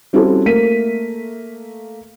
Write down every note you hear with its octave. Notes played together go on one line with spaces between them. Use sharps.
G3 C4 C#4 E4 F#4 A4
A3 A#3 A#4 B6 D#7